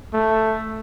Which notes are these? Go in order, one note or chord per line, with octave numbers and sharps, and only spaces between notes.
A3